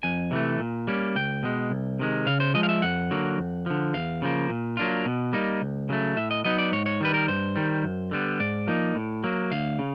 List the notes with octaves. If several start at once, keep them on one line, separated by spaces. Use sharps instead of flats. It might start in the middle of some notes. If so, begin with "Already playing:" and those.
F2 G#5
C3 E3 A3
A#2
G3 A#3 C#4
C#2 G5
B2 G#3
C2
C3 D#3 G#3
C#3 F5
C5
F3 G#3 D#5
F5
E5
F2 F#5
D3 F#3 A#3
F2
D3 F3
E2 F5
C#3 F3 A#3
A#2
F#3 A#3 D4 F4
B2
G3 A#3 D#4
C#2
C#3 F#3 A3
A2 E5
D#5
F#3 B3 D#4 D#5
D5
G#2 C#5
C#5
D#3 G3 B4
A#4
G2 C5
D#3 G3
F#2
D3 G3 B3
G#2 D5
F3 A#3 D#4
A2
F#3 A#3
D2 F5
C#3